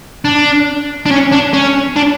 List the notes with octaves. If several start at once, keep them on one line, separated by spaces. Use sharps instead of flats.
D4
D4
C#4
D4
C#4
D4